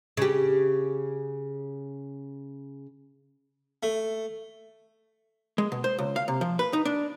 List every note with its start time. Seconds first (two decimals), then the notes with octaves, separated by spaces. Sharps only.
0.17 C#3 G4
3.83 A3
5.58 G#3
5.72 B2
5.84 C5
5.98 C#2
6.16 F5
6.28 C3
6.41 F3
6.59 B4
6.73 D#4
6.85 D4